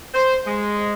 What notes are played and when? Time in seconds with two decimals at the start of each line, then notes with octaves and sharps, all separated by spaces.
0.14 C5
0.47 G#3